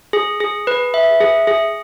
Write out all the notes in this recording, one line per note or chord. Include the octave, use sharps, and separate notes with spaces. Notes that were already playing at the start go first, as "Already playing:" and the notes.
G#4
G#4
B4
E5
G#4
G#4